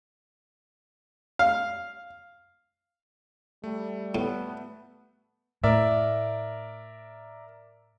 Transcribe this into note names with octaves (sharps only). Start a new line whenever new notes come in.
F5
G3 A3
A2 B3
A2 A#4 D5 E5